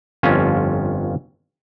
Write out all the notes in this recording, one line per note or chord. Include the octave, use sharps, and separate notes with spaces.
G1 F2 C#4 F4